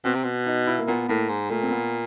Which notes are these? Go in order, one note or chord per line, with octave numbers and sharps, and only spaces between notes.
B2 C4
C3
B2
D#4
E4
A#3
A#2 B3
A2 A#3
G#2
A#2 A3
C4
B3